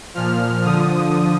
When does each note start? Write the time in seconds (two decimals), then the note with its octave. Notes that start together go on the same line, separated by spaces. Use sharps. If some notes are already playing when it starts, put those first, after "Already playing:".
0.14 A#2 F3 F6
0.65 D3 F3 D#6